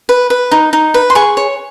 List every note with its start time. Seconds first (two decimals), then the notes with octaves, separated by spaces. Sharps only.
0.09 B4
0.30 B4
0.51 D#4
0.73 D#4
0.94 B4
1.10 C6
1.15 G#4 C#6
1.37 C#5